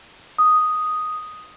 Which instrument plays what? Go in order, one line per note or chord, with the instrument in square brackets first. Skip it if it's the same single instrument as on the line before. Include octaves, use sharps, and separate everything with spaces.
[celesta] D#6